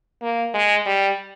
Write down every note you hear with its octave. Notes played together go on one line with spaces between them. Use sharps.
A#3
G#3
G3